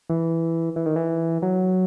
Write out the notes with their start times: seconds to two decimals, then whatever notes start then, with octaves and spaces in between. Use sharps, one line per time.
0.09 E3
0.76 E3
0.86 D#3
0.96 E3
1.42 F#3